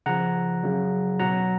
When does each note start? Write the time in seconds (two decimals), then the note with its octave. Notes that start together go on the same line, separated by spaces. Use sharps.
0.06 C#3 F3 F#5 A#5
0.64 C#3 F#3
1.20 B2 F#3 F#5 A#5